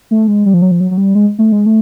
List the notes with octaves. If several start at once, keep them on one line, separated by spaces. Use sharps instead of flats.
A3
G#3
G3
F3
F#3
F3
F#3
F#3
G3
G#3
A3
G#3
A3